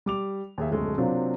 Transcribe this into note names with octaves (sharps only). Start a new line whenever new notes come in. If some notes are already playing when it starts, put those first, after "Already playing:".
G3 D6 F7
D#2 G#4 E5
D1 B1 F#2 G#3 A3
C3 F#3 A#3 C4 D4 F4